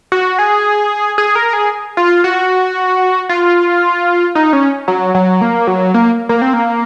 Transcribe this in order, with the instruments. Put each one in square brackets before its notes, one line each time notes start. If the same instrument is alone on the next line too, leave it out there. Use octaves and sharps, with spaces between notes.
[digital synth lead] F#4
G#4
G#4
A#4
G#4
F4
F#4
F4
D#4
C#4
F#3
F#3
A#3
F#3
A#3
A#3
C4
A#3